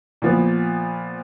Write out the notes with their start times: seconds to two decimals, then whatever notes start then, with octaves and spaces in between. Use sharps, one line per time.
0.22 A#2 F3 B3